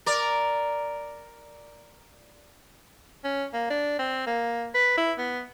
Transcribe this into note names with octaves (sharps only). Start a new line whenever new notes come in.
A#4 D5
C#4
A#3
D4
C4
A#3
B4
E4
B3